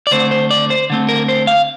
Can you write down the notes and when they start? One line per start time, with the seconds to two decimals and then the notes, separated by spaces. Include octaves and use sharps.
0.07 D5
0.11 D3 A3 C4 C5
0.31 C5
0.50 D5
0.70 C5
0.90 D3 A3 C4
1.08 A#4
1.28 C5
1.47 F5